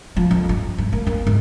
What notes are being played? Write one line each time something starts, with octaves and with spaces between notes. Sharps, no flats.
F3
F2
G2
G#2
A#3
A#3
G#2